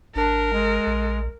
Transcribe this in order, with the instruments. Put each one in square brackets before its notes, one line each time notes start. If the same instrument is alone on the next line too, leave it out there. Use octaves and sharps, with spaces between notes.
[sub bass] G#1 [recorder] D4 [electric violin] A#4
[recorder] G#3
[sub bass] A#1